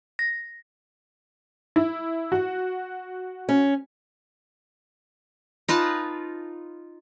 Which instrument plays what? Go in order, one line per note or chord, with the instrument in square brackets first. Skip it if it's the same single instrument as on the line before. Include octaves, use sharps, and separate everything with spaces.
[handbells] A#6
[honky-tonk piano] E4
F#4
[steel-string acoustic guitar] C#4
[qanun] D#4 F4 B4 A5